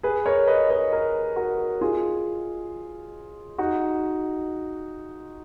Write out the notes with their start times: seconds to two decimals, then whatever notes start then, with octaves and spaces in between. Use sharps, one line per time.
0.03 G#4 B4
0.26 A#4 C#5
0.47 B4 D#5
0.70 B4 D#5
0.93 A#4 C#5
1.36 F#4 A#4
1.81 F4 G#4
3.58 D#4 F#4